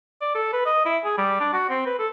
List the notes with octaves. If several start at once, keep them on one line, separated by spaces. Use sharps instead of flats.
D5
A4
B4
D#5
E4
G#4
G3
D4
F#4
C4
B4
A4